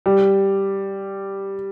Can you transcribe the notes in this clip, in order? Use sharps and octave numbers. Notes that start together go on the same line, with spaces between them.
G3